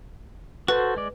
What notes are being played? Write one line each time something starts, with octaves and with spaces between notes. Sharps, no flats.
F#4 A4 B4 C5
G#3 D5